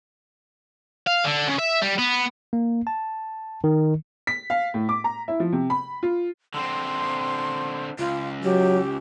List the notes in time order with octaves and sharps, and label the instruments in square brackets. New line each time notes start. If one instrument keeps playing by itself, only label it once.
[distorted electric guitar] F5
D3
C#3
E5
G3
B3
[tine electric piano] A#3
A5
D#3
[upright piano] B6
F5
A2
D6
A#5
E4
F3
C3
B5
F4
[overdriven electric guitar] D3 C4 [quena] C6
[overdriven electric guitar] C#2 [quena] F4
[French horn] F#3 [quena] G4